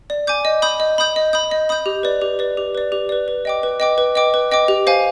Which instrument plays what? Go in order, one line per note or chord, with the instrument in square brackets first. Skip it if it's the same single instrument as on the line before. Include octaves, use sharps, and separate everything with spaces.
[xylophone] D5
G#5 D6 G6
D#5
B5 D#6 G6
D#5
B5 D#6 G6
D#5
B5 D#6 G6
D#5
B5 D#6 G6
G4
B4 D5
G4
B4 D5
G4
B4 D5
G4
B4 D5
B4
D#5 G5 D6
B4
D#5 G5 D6
B4
D#5 G5 D6
B4
D#5 G5 D6
G4
C5 F5 G#5